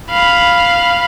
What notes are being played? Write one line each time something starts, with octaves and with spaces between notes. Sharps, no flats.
F5 B5